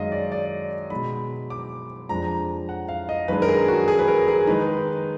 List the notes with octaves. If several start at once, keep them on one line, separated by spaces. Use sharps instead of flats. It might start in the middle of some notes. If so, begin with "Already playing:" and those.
Already playing: F#2 D#3 G#3 D#5 F5
D5
D5
B2 G#3 D#4 B5
D6
F2 F3 G#3 D4 A#5
F#5
F5
D#5
F#2 D#3 G#3 D4 B4
A#4
G#4
F#4
G#4
B4
A#4
G#4
D#3 G#3 D#4 B4